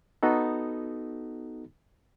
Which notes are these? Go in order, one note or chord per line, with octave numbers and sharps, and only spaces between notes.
B3 D#4 F#4 A4